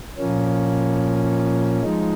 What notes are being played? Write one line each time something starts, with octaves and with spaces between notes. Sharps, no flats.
A#2 F3 A#3 C#4
F3 G#3 D#4